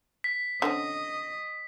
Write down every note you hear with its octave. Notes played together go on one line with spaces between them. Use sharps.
B6
D3 C4 C#4 D#5